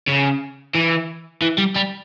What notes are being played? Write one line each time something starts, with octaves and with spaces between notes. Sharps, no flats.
C#3
E3
E3
G3
G3